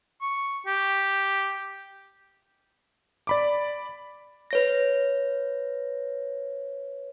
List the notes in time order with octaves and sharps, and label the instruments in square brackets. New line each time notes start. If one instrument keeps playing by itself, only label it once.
[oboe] C#6
G4
[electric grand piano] D5 B5 D6
[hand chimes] B4 C#5 A#6